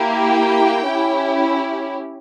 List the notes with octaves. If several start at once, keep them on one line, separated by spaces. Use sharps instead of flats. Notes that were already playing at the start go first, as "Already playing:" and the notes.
Already playing: A#3 E4 G4
G5
C#4 E4 G4